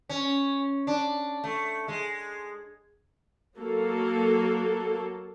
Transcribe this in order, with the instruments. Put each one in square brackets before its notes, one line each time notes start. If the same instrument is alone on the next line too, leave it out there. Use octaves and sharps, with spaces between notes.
[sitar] C#4
D4
A3
G#3
[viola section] F#3 A#3 A4